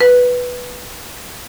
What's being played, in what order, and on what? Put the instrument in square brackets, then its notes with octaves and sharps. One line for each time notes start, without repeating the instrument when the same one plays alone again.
[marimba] B4